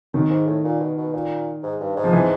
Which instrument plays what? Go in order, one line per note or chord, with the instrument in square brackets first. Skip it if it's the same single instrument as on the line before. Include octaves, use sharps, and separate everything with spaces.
[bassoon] F#2 [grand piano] D#3
[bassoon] G#2
A2
A#2
B2
B2
A#2
G#2
G2
G#2
[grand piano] F3
E3